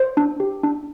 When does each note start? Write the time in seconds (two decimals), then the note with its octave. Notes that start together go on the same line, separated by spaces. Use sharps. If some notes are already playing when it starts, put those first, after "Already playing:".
Already playing: C5
0.17 D4
0.40 G4
0.63 D4